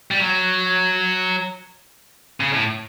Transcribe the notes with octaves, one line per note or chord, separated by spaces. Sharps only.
G3
F#3
C#3
A2